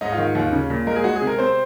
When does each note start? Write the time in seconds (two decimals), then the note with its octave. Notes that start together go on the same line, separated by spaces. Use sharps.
0.01 G#2 D#4
0.12 F4
0.18 D#3
0.35 D#2 F4
0.52 C#3
0.70 A#2
0.87 G#3 A#4
0.96 G#4
1.04 G#3 F#4
1.16 G#4
1.22 C3
1.27 A#4
1.39 C4 C5